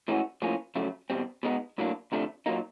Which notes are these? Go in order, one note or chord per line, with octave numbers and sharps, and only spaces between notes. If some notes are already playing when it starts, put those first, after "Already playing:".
A2 E3 G#3 C#4 F#4
A2 F3 A#3 C#4
F2 C#3 F#3 A3
E2 B2 G3 C4
B2 G#3 B3 D#4
B1 A2 F#3 A#3 D4
D2 C3 F3 A3 D4
A#2 F#3 A#3 D#4